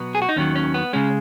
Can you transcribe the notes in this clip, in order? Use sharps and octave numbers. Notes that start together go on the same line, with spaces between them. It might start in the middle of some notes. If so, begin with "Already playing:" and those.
Already playing: B2 F#3 B3
G#4
F#4
D#4
D#2 D#3 F#3 C#4
C#4
B3
C#3 G#3 C#4